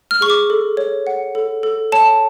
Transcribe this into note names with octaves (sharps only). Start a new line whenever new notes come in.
F6
G#4 C#6
D6
A4
C#5
F#5
A4
A4
C#5 A5